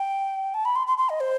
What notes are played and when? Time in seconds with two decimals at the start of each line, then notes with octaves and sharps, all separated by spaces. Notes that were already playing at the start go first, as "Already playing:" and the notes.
Already playing: G5
0.54 A5
0.65 B5
0.76 C6
0.87 C6
0.98 C6
1.09 D#5
1.20 C5